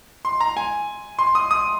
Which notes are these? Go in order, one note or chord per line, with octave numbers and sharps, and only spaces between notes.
C6
A#5
G#5
C6
D#6
D#6